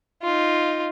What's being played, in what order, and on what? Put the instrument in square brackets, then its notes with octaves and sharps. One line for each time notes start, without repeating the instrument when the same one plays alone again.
[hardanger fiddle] D#4 F4